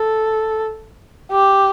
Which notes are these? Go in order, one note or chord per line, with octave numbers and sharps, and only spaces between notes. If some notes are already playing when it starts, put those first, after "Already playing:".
Already playing: A4
G4